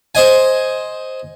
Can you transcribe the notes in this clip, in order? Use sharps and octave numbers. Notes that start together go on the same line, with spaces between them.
C5 D#5 G#5